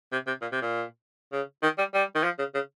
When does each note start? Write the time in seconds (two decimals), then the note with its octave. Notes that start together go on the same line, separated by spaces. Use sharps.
0.12 C3
0.27 C3
0.41 A#2
0.52 C3
0.62 A#2
1.32 C#3
1.63 D#3
1.78 G3
1.94 G3
2.15 D#3
2.24 F3
2.39 C#3
2.54 C#3